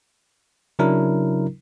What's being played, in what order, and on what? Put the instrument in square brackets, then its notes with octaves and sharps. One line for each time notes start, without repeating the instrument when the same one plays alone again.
[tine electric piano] C#3 F#3 D4 E4 A#4